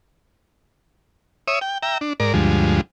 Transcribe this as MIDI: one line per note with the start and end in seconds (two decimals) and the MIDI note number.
1.48 1.59 73
1.48 1.59 76
1.48 1.59 87
1.61 1.78 79
1.83 1.98 76
1.83 1.98 79
1.83 1.98 82
2.01 2.13 62
2.20 2.33 44
2.20 2.33 70
2.20 2.33 74
2.34 2.81 38
2.34 2.81 43
2.34 2.81 53
2.34 2.81 56